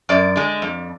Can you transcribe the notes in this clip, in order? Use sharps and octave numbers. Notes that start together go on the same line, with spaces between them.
F#2 D5
D3 G#3
F2